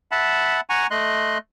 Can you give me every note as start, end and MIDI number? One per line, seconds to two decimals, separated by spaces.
0.11 0.61 76
0.11 0.61 78
0.11 0.61 81
0.11 0.61 83
0.70 0.87 78
0.70 0.87 80
0.70 0.87 82
0.70 0.87 85
0.91 1.38 57
0.91 1.38 75
0.91 1.38 84
0.91 1.38 90